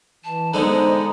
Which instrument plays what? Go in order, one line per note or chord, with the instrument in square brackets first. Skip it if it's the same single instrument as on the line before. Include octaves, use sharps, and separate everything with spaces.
[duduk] E3 [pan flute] A5
[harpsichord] D3 G#3 B3 [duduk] D#4 [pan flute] C5 [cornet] A#5